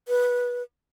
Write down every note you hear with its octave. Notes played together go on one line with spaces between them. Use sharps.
B4